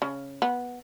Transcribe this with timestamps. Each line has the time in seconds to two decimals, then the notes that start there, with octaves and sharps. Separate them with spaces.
0.02 C#3
0.42 B3